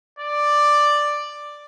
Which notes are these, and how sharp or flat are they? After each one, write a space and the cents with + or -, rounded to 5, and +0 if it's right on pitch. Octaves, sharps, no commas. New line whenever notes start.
D5 +5